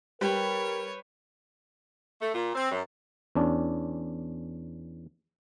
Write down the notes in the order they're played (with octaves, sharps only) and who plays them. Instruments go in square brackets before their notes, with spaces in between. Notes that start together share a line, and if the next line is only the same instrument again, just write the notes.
[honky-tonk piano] G3 [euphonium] A#4 [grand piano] B4 G5 B5 [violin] C#5
[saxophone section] A3
A#2
C4
F#2
[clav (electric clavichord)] E2 C#4 D4